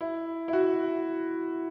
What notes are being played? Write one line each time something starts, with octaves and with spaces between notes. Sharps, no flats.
E4
E4
F#4